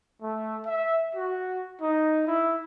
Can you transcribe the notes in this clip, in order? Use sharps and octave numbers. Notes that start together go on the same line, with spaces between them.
A3
E5
F#4
D#4
E4